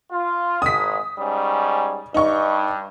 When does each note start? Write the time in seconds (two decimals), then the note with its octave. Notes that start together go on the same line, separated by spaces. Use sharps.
0.11 F4
0.62 G#1 G#3 D#6 B6
1.19 G#2 G3 C#4
2.14 G2 D#4 C#6